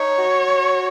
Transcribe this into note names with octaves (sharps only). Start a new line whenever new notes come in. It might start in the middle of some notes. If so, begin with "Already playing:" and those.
Already playing: D#4 C#5
F#4